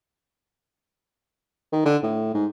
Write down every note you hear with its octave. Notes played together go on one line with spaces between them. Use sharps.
D#3
D3
A2
G#2